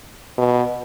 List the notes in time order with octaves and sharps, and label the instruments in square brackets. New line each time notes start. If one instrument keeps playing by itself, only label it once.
[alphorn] B2